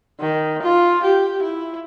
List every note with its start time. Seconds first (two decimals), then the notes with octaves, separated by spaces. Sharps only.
0.20 D#3
0.62 F4
1.03 G4
1.43 E4